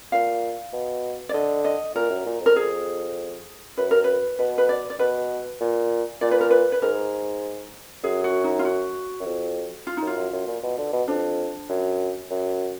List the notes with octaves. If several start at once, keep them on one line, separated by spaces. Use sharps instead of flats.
A#2 F5
B2
D5
D3 D#5
D#5
A#2 A#4
F#2
A#2
F2
A#4
G#4
F#2 B4
A#4
B4
B2 B4
B4
D5
D5
B2 B4
A#2
A#2 D5
B4
A#4
B4
B4
G#2 A#4
F#2 G#4
F#4
D#4
F4
F#4
F#2
F2
F4
F#2 D#4
F4
F#2
F#2
A#2
B2
D3
B2
F2 D4
F#2
F#2